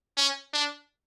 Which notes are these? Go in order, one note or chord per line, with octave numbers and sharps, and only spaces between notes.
C#4
D4